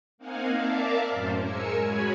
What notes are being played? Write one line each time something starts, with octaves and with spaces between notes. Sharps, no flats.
A#3 C4 D#4 F5 F#5 G#5
A#4 D5 E5 F5 A5 D6
F#2 A2 C#4 C5
G#3 A#4 G#5 E6 C#7
F#4 G#4 C#5 G#5 B5